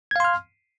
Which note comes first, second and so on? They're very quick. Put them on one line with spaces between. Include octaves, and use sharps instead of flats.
G#6 F5 C6 F6